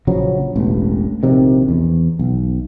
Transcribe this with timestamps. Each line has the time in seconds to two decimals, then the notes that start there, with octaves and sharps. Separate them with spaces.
0.07 A#1 C#3 F3 F#3
0.56 E1 A1
1.23 A#1 C3 D#3
1.68 E2
2.19 B1